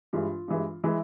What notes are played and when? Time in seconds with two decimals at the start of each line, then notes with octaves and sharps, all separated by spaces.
0.13 G2 E3 G#3 F4
0.48 G2 E3 G#3
0.84 E3 G#3 E4